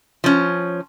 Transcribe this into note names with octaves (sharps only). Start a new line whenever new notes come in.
F3 C#4